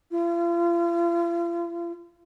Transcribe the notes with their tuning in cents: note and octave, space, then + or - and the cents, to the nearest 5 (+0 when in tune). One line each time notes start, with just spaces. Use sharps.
F4 -40